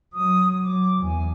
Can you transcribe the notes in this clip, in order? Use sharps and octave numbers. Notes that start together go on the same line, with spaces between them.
F#3 D#6
F#3 D6
E2 G#5